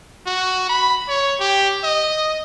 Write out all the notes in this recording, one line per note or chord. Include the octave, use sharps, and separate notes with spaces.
F#4
B5
C#5
G4
D#5